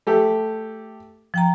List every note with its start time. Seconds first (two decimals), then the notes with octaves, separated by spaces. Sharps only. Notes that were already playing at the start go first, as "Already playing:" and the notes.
0.07 A3 G4 A4
1.34 F3 G5 A#5